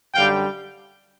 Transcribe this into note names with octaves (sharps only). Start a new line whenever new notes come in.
F#2 D3 G3 F5 G5